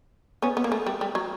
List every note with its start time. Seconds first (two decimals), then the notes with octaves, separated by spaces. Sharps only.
0.42 B3 C#4
0.57 B3
0.64 A#3
0.72 A3
0.86 G3
1.01 G3
1.15 F#3